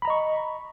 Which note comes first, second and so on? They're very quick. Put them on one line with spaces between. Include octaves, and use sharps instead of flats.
B5 A#5 D#5 C#6